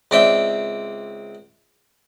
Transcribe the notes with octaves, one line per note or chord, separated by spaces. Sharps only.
C#2 C4 D5 E5 G5